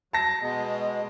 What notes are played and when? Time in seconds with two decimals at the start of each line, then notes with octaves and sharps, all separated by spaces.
0.13 F#3 A5 A#6
0.41 B2 G#3